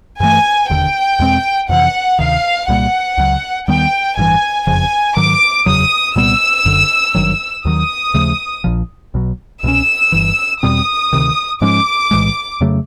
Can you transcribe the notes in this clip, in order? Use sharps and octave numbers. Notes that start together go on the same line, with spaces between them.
G2 E3 A3 G#5
E1 D#2 D3 G5
E2 B2 G#3 C4
F2 C3 E3 F#5
D2 C3 D#3 F5
C2 A#2 G3 A#3 F#5
C#2 C#3 F#3
D#2 D#3 G3 B3 G5
A1 G2 E3 G#5
F#1 F2 C#3 F3 G#5
G#2 D#3 F#3 D6
F#1 E2 C#3 F#3 D#6
C2 A#2 G3 B3 E6
F#1 F#2 D3
G#1 G2 D#3 F#3
D#2 D#3 F#3 D#6
D#2 C#3 F3 A3
A#1 A#2 F3
B1 B2 F#3
C2 B2 G#3 C#4 E6
G1 G2 E3
E2 B2 G3 C4 D#6
D2 C3 D#3
G#2 F3 G#3 C#4 D6
B1 A2 E3 G#3
F2 C#3 F#3 A3